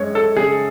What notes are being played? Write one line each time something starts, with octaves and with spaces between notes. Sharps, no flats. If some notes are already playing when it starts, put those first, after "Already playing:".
Already playing: F#2 G#3 C#5
A4
C#3 G#4